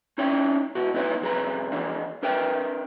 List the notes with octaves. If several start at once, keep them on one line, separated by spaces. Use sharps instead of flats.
C#4 D#4 E4 C#5 G5
B2 B3 E4 F#4
B3 D#4 E4 B4 C#5
C2 F2 G#4 B4 A#5 B5
E2 E3 D4 F5
D4 A#4 B4 E5 G5